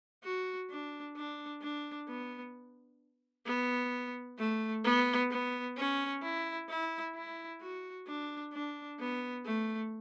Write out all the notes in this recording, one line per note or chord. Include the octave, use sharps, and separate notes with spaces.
F#4
D4
D4
D4
B3
B3
A3
B3
B3
C#4
E4
E4
E4
F#4
D4
D4
B3
A3